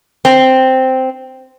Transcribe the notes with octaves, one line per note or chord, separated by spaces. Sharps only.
C4